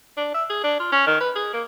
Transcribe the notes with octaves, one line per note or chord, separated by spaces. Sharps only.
D4
E5
G#4
D4
F4
C#4
D#3
B4
G#4
A#3